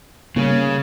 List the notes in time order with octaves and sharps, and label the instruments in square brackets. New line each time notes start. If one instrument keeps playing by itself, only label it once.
[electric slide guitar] C#3 C#4 [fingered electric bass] G3 A#3